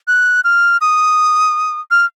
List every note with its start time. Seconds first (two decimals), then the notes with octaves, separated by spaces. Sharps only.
0.08 F#6
0.44 F6
0.81 D#6
1.91 F6